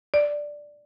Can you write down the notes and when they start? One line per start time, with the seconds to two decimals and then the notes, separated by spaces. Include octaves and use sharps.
0.14 D5